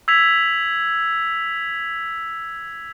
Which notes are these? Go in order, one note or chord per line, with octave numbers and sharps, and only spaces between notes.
E6 G#6 B6 F7